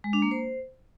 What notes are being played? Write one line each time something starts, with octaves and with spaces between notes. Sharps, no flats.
G#3
D4
A#3
C5